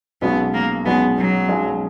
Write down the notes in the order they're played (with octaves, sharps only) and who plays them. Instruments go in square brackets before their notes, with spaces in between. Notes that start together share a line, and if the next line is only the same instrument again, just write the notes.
[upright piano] B1 B2 G#3 C#4 [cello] B3
[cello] A#3
[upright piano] B1 B2 G#3 C#4 [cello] B3
[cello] F#3
[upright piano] B1 B2 G#3 C#4